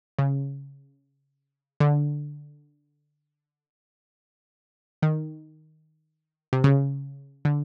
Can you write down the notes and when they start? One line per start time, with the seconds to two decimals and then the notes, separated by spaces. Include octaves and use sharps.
0.19 C#3
1.80 D3
5.02 D#3
6.53 C3
6.64 C#3
7.45 D3